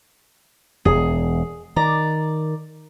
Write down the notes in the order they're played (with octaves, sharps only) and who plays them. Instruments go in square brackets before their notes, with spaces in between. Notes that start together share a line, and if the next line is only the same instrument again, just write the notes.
[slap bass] E1 E2 [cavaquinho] G#4
[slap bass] D#3 [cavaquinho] D5 A#5